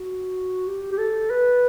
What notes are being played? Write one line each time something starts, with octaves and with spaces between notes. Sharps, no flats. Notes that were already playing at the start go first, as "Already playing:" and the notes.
Already playing: F#4
G4
G4
A4
B4